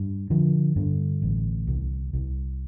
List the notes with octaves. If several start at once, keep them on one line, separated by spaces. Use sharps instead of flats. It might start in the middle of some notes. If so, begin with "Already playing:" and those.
Already playing: G2
D3 F3
G2 D3
A1
C2
C2